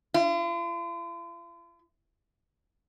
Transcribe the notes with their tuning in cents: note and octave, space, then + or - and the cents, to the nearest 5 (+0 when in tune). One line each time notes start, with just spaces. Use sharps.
F4 -45